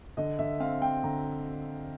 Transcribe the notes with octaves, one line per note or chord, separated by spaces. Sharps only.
D3 D#5
D3 E5
C4 F5
C4 G5
D3 A#5